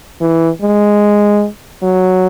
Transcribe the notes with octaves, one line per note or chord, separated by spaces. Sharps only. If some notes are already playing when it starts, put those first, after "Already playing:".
E3
G#3
F#3